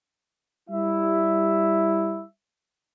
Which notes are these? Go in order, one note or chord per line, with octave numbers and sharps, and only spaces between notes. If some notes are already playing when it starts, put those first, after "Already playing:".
G3 E4 E5